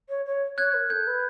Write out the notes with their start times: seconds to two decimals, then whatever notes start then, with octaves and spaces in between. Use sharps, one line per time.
0.09 C#5
0.25 C#5
0.58 C#5 F#6 G#6
0.74 A#4
0.90 A4 G6
1.07 B4